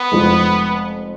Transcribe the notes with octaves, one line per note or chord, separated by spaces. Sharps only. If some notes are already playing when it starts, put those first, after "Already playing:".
Already playing: B3
F1 F2 F3 G#3